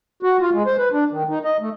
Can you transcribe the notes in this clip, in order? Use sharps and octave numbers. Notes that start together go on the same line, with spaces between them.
F#4
F4
G#3
C5
B4
D4
D#3
D#4
D#5
A3